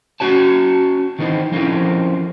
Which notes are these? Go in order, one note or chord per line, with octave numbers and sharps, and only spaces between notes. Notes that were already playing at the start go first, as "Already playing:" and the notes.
C#4 F#4 C#5 A5
D#3 E3 C4 D#4
F3 C4 C#4 E4 A#4